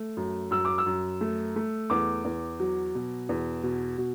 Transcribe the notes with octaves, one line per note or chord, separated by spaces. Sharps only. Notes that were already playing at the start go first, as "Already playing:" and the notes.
Already playing: A3
F#2
F#2 E6
D6
E6
F#2
A3
A3
E2 D6
E2
F#3
B2
E2
B2
B2